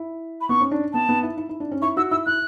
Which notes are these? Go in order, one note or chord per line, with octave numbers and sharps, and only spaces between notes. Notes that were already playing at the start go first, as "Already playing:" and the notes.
Already playing: E4
B5
B3 C#6
C#4
D4
B3 A5
B3
E4
E4
E4
D4
C#4
E4 C#6
F#4 E6
E4 E6
E4 F#6